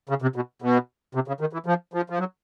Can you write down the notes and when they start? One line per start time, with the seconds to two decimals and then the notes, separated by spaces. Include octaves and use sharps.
0.09 C#3
0.22 C3
0.36 B2
0.62 B2
1.15 C3
1.28 C#3
1.40 D#3
1.53 E3
1.66 F3
1.94 F3
2.10 F3
2.19 F#3